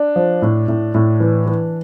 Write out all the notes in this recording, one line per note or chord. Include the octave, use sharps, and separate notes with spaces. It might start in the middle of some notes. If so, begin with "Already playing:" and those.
Already playing: D4
F3
A2
A2
A2
E3
E3